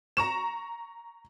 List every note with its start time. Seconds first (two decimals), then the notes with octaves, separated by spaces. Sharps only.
0.17 A#5 C#6 E7